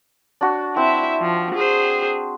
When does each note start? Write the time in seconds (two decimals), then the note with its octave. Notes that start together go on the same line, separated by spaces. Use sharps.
0.41 D4 F#4
0.76 C4 E4 E5
1.21 F3
1.55 G#4 C5